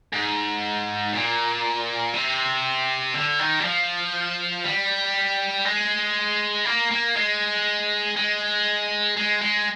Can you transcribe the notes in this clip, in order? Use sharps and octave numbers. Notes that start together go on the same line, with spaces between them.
G#2
A#2
C3
D3
D#3
G3
F3
G3
G#3
A#3
A#3
G#3
G#3
G#3
G#3